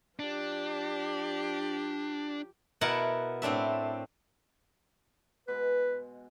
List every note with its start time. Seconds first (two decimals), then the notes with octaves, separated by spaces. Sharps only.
0.19 F3 D4 G4
2.81 B2 E4 A#4 F#5 A5
3.42 A2 C4 D4 E5
5.48 B2 G#3 B4